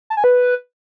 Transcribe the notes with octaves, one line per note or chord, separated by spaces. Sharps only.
A5
G#5
B4